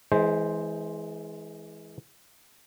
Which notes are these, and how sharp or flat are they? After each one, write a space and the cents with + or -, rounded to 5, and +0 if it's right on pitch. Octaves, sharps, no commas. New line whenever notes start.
E3 -20 G#3 +15 C5 +0